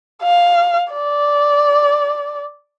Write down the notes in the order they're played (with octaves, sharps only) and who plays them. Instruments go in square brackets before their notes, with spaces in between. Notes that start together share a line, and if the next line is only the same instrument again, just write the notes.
[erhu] F5
D5